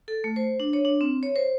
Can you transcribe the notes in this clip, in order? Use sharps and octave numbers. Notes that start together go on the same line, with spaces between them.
A4
A3
C5
D4
C#5
D4
C4
C#5
C5